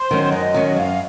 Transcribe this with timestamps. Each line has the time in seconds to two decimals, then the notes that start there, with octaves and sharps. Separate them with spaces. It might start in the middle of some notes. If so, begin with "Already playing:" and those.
Already playing: C5
0.11 D#3 F#3 C#4
0.32 F#2 D#5
0.54 D#3 F#3 C#4
0.76 F#2 F5